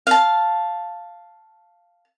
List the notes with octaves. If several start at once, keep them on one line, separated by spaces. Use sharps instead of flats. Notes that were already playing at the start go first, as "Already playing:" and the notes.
F5 A5